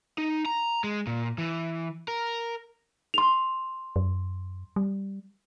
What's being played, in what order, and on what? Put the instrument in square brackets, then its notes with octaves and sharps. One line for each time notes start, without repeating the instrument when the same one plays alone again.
[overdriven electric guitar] D#4
A#5
G#3
A#2
E3
A#4
[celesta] C6 F7
[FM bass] F#2
G3